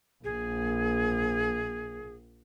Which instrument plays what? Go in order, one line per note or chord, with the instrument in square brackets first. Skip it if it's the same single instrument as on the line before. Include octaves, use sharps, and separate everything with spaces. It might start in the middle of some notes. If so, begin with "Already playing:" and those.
[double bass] A#1 [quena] G#4